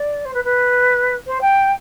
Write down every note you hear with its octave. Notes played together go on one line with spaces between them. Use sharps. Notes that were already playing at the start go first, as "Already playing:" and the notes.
Already playing: D5
C5
B4
B4
C5
G5